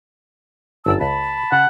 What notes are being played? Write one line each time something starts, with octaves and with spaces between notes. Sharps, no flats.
G1 F#2 D5 A5 E6
C#2 A5 B5
C#3 F#5